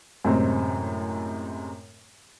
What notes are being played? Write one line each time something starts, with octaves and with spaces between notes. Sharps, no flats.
F#2 A2 C3 G#3 C4